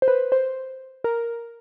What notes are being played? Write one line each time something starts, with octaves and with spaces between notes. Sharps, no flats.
C5
B4
C5
A#4